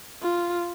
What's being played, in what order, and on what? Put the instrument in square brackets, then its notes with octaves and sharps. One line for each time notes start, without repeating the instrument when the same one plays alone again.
[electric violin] F4